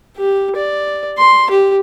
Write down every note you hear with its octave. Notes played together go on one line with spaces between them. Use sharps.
G4
D5
C6
G4